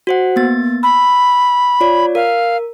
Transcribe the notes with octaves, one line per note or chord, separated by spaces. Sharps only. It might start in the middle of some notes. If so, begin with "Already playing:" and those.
F#4 C5 F#5
A#3 B3 A6
B5 E6
F4 C#5 D5
A#4 F5